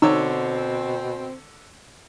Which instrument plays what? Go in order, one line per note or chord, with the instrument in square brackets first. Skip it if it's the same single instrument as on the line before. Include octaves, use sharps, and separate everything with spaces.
[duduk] B2 [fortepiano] D3 C#5 E6 [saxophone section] C4 [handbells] D#4